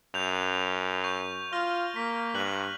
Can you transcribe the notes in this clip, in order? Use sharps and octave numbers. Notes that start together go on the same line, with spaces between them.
F#2 G6 F7
C#6 G6
F4 F6 A#6 G7
A#3 B6
G2 F#6 F#7